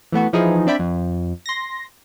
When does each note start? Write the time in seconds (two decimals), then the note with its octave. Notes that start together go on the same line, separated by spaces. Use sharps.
0.12 E3 A3 B3 F#4
0.33 E3 F3 D#4 E4 G#4
0.67 C4 D4 D5 E5 G5 B5
0.79 F2
1.46 C6 A#6